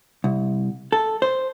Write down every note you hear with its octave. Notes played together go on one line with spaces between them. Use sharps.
C2
A4
C5